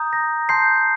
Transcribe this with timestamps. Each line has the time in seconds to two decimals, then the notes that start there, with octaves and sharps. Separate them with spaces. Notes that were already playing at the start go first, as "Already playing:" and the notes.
Already playing: A#5 D#6 G6
0.13 A#6
0.49 A5 C6 G6 C7